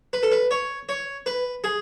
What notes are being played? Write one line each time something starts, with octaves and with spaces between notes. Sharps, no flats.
B4
A4
B4
C#5
C#5
B4
G#4